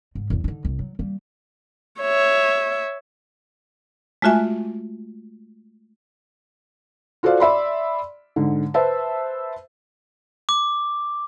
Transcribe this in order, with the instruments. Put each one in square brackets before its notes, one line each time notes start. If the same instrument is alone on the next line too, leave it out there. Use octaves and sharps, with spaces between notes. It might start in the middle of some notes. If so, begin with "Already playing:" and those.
[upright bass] G#2
E1 E2
D3 D#4
C2
F#3
G3 A#3
[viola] C#5 E5
[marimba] G#3 A3 F4 F#4 E5 G#5
[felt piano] F4 F#4 A4 C5 D5 F5
D5 E5 B5 C6
G#2 D3
B4 C5 E5 A5
[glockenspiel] D6